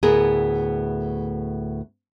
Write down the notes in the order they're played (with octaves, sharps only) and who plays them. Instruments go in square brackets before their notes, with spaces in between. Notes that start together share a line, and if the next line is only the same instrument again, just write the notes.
[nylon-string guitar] D2 A2 B3 G#4 A#4